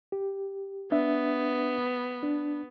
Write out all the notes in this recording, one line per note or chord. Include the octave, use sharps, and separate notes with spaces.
G4
B3 D4 E5
D4